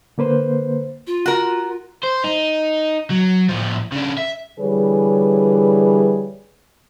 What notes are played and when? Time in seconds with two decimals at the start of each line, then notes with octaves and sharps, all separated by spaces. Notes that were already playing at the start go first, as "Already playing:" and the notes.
0.18 D3 A#3 B4 C5
1.07 F4
1.26 F#4 A#4
2.04 C5
2.24 D#4
3.10 F#3
3.49 A2 F3
3.92 C#3 D4
4.18 E5
4.59 D3 E3 G3 G#4 B4 C#5